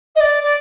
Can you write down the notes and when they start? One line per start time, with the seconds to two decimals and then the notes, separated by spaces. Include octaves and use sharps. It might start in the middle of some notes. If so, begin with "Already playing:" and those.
0.15 D#5
0.20 D5
0.43 D5